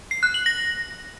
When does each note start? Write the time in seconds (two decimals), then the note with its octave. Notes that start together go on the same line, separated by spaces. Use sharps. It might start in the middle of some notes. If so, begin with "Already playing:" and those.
0.11 C7
0.23 F#6
0.34 F#7
0.46 A#6